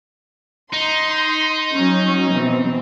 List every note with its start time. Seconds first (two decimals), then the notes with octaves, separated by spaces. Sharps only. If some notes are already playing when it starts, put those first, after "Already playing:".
0.73 D#4 C6
1.73 F#3 C#4
2.32 B2 E3 C4